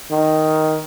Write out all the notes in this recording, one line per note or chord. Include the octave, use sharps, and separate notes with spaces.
D#3